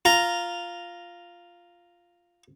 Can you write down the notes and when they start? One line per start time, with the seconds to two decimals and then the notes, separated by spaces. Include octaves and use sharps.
0.05 F4 A#5